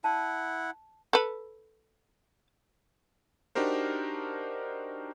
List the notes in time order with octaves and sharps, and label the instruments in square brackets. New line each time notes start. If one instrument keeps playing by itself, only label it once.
[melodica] E4 F#5 [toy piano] A5
[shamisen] A4 B4
[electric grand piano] D4 D#4 F#4 G4 A#4 C5